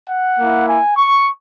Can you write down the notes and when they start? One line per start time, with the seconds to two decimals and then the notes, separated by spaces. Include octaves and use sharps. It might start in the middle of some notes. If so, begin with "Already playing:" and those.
0.09 F#5
0.38 A#3 E4
0.67 G#5
0.97 C#6